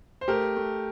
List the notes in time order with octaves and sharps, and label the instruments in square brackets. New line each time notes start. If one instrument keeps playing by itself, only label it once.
[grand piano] C5
A3 G4 A#4
A3